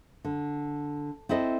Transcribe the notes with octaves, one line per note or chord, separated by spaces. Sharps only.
D3
C4 E4 A4 D#5